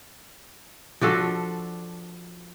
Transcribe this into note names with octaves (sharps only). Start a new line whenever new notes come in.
F3 D4 F#4 A4